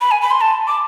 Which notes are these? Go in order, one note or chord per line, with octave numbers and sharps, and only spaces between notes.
B5
G#5
B5
C6
A5
D6